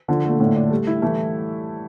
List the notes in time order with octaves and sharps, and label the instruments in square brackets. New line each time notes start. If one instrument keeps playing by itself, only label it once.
[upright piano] D3 [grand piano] F3
[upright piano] A#2 [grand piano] A3
[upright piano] A2 [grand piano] D3
[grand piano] D4
[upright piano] G3 [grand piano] A3
[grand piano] E4
[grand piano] E3 [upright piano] A3